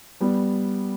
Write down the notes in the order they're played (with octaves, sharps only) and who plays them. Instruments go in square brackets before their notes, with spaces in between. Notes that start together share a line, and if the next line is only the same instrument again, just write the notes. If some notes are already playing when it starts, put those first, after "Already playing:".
[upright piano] G3 B3